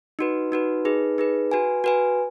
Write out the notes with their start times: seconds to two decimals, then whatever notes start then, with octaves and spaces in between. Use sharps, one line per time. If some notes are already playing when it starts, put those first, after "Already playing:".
0.19 D#4 F#4 B4
0.52 D#4 F#4 B4
0.85 D#4 G#4 B4
1.18 D#4 G#4 B4
1.51 F#4 B4 G#5
1.84 F#4 B4 G#5